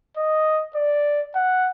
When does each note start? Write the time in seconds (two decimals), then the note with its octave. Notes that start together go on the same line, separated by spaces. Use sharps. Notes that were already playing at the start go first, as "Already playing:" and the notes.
0.17 D#5
0.75 D5
1.35 F#5